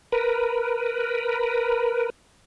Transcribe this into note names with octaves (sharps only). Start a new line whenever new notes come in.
A#4 B4